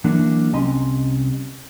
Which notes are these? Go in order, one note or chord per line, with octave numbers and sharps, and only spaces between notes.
E3 F#3 A#3 D4 F#4
C2 C4 C#4 D#5 A#5 C6